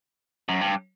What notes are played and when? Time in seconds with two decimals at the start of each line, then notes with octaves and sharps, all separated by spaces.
0.49 F#2
0.61 G2